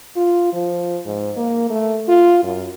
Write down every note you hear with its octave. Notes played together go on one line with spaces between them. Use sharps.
F4
F3
G#2
A#3
A3
F4
F#2